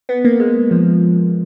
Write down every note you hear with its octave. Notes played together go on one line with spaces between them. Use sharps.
B3
A#3
G#3
F3